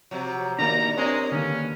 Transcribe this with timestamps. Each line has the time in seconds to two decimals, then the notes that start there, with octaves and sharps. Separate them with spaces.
0.11 C3 F3 F#3
0.59 A#2 D#3 A#3 D4 D5 A#5
0.98 G#3 C4 D4 G4 A#4 C#5
1.32 G2 D3 D#3 A#3 C#4